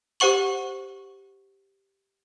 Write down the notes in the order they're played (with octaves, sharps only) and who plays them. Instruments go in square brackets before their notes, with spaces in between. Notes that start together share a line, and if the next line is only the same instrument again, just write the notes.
[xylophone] G4 C5 F#5 C#6 F#7